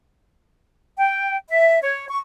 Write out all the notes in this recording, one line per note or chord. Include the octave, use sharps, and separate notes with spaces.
G5
E5
C#5
C#6